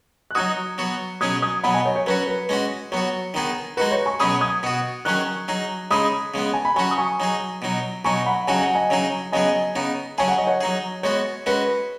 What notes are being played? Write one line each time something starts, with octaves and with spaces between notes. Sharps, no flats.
F#6
F#3 D#4 F#4 D#6 G#6
F#3 B3 F#4
B2 F#3 C#4 G#4 D#6 G#6
D#6 G#6
B2 F#3 B3 F#5 B5
D#5 G#5
C#5
C#5
F#3 C#4 F#4 B4
B4
G#3 C#4 F#4
F#3 B3 F#4 C#5
D#3 B3 D#4 G#4
G#3 D#4 F#4 B4
C#5
G#5 C#6
B2 F#3 C#4 G#4 B5 D#6
D#6 G#6
B2 B3 F#4
D#3 F#3 C#4 G#4 C#6 F#6
F#3 D#4 G#4
C#3 G#3 D#4 G#4 B5 D#6
C#3 G#3 B3
G#5
B5
F#3 C#4 F#4 G#5 C#6
D#6
G#5 C#6
F#3 D#4 G#4
B2 F#3 D#4
B2 F#3 D#4 G#5 C#6
F#5 B5
C#3 F#3 D#4 F#4 G#5
F#5
D#5 G#5
C#3 F#3 D#4 G#4
C#3 F#3 B3 G#4 D#5 G#5
C#3 B3 D#4
C#3 F#3 C#4 G#4 G#5
F#5
D#5
C#5 F#5
F#3 D#4 G#4
G#3 B3 F#4 C#5
G#3 C#4 F#4 B4